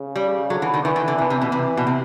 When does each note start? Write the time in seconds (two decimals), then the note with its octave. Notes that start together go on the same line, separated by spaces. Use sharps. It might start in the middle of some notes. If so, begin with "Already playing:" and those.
Already playing: C#3
0.16 G3
0.50 D3 F#3
0.62 E3
0.74 D#3
0.84 D#3 E3
0.96 D#3
1.08 D3
1.18 C3 E3
1.30 C3
1.42 B2
1.52 C3 E3
1.77 B2
1.87 C3